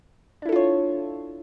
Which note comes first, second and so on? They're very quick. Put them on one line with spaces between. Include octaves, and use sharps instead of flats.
D4 E4 A4 F4 C#5